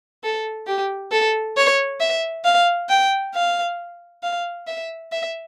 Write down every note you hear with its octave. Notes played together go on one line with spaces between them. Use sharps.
A4
G4
A4
C#5
E5
F5
G5
F5
F5
E5
E5